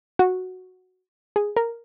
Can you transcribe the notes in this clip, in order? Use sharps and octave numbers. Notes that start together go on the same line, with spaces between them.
F#4
G#4
A#4